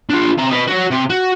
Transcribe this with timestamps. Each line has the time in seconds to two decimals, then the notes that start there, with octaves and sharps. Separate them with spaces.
0.10 D4 F4
0.37 C3 A#5
0.51 B4 D#5
0.67 F#4 C#5
0.90 C3
1.10 F#4